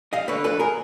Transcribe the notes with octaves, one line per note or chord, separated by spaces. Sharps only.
G3 D#5 F5
D3 B4 C#5
F2 A4 B4
G#4 A#4